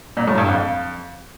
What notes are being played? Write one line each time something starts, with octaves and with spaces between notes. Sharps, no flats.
A#2
A2
G2
F2